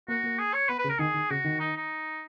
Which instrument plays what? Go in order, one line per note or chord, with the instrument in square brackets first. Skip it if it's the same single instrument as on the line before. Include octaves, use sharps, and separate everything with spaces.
[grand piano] A#3 [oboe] F#4
[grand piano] A#3
[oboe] G#4
C#5
[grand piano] B3 [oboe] B4
[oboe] B4
[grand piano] C#3
[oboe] A#4
[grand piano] D#3 [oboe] G#4
[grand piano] D#3
[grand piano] C#3 [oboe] F#4
[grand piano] D#3
[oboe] D#4
D#4